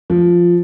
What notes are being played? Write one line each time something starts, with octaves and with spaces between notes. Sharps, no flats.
F3